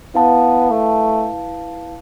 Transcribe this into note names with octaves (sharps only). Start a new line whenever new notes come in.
B3 E4 B4 F5 A5
A3